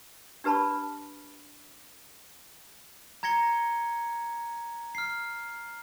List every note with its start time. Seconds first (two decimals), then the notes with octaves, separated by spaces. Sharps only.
0.44 D4 G4 B4 A5 B5 C#6
3.23 A#5 G#6 A#6 C#7 G7
4.95 F6 C7